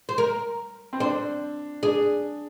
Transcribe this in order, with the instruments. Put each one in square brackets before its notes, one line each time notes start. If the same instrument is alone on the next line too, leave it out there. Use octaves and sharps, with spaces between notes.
[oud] C5
A#4
[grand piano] C4
[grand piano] D4 [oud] C5
[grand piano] D4 [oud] G#4